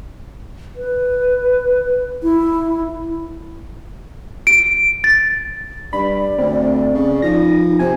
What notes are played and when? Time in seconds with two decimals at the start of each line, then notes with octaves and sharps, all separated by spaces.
0.76 B4
2.23 E4
4.47 D7
5.04 A6
5.93 G2 D5 B5
6.38 D2 C4
6.94 C#3
7.22 F3 D#4 A#6
7.79 C3 C5 G#5